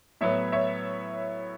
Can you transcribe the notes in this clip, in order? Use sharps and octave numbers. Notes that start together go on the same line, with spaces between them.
A2 F#3 B3 C#5 E5
C#5 E5